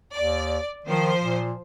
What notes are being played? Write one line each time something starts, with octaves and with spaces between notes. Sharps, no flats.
D#2 D5
D#3 F3 C5
A#2